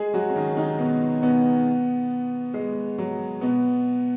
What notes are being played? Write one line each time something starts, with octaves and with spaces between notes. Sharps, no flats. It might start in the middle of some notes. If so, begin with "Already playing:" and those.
Already playing: G#3 G#4
F#3 F#4
C#4
D#3 D#4
D#3 D#4
B2 B3
B2 B3
G#3
F#3
B2 B3